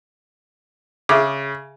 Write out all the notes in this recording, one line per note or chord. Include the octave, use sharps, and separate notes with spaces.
C#3 G#4 E5 D6